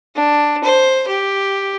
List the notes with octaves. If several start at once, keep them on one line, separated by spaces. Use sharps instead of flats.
D4
C5
G4